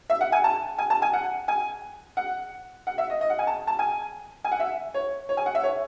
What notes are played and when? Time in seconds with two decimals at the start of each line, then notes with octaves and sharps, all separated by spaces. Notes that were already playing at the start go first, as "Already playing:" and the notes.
0.10 E5
0.21 F#5
0.32 G#5
0.44 A5
0.78 G#5
0.90 A5
1.02 G#5
1.13 F#5
1.48 G#5
2.17 F#5
2.87 F#5
2.98 E5
3.10 D#5
3.21 D#5
3.30 F#5
3.39 G#5
3.47 A5
3.67 A5
3.79 G#5
4.44 G#5
4.52 F#5
4.60 E5
4.94 C#5
5.29 C#5
5.37 G#5
5.46 F#5
5.55 E5
5.63 C#5